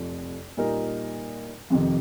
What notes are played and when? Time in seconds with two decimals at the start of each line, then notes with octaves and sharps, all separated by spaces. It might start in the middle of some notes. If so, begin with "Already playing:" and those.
Already playing: F1 F2 F3
0.57 A#2 G3 D#4 A#4
1.70 F2 C3 D#3